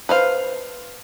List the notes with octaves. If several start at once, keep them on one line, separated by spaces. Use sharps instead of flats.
B4 C5 F5